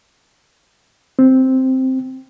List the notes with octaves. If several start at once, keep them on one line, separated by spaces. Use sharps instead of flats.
C4